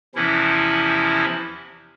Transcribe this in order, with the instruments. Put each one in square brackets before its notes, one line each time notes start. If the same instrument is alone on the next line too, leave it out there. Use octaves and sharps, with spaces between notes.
[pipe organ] E2 C3 E3 F3 C#4 E4